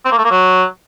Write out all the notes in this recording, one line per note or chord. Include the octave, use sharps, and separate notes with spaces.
C4
A#3
A3
A#3
F#3